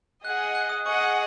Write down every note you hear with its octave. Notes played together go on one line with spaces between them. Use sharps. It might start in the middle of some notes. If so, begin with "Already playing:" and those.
G#4 D#5 F#5 F#6
F#6
D#6
G#4 D#5 F#5 C#6
D#6